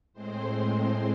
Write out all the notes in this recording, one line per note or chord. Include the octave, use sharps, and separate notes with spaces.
A2 G#3 C4 C5